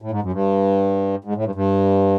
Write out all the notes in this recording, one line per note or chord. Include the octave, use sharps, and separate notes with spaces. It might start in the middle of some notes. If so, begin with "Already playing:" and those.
A2
G#2
F#2
G2
G#2
A2
G2
G2